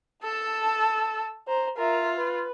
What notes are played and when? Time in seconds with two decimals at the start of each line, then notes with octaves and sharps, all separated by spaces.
0.23 A4 A5 E6
1.48 C5 A#5
1.78 F4 A#4 E5
2.16 B4